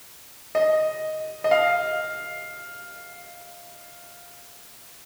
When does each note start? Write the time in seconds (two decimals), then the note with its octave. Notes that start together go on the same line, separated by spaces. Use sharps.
0.55 D#5
1.44 D#5
1.51 F5